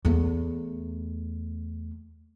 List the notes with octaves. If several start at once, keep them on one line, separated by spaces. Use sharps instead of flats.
E2 A3